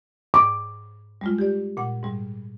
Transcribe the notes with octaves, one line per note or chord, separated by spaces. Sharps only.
G#2 D6
G3 G#3 F4
G4 D5
A#2 F#5
G#2 G3